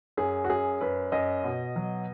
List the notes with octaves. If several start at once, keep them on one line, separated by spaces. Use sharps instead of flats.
F#2 G#4
F#4
F#2 G#4
F#2 B4
F#2 D#5
B2
F#3